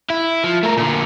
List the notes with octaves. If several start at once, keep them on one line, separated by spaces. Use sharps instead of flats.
E4
F3
A3 A#4
A#2 D3